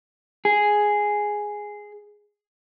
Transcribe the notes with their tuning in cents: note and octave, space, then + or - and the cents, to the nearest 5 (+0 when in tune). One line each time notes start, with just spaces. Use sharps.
G#4 +0